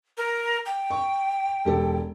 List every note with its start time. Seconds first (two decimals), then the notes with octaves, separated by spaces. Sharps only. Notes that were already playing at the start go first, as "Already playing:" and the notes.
0.17 A#4
0.66 G5
0.90 C#6
1.65 E1 G4 A4